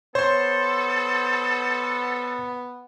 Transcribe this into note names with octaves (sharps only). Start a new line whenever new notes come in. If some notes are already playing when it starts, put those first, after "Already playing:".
B3 A4 C5 C#5 C6